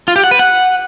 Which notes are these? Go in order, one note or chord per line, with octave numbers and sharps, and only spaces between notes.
F4
G4
F#5
B4
F#5